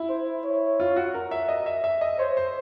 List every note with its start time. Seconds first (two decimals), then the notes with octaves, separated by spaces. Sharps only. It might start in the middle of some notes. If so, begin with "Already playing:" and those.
Already playing: E4
0.09 C5
0.44 C#5
0.80 F4
0.96 F#4
1.14 A#4
1.31 E5
1.48 D#5
1.66 E5
1.84 E5
2.01 D#5
2.19 C5 C#5
2.37 C5